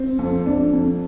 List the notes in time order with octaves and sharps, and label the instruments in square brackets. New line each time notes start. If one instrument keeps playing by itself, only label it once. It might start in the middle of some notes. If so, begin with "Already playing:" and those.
Already playing: [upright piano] C4
F2
F2 D4
F2